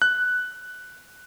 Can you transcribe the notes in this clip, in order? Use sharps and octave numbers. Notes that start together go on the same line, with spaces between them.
F#6